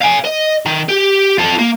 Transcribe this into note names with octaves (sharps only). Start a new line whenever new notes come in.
F5 G#5
D#5
D#3
G4
F4 A4
A#3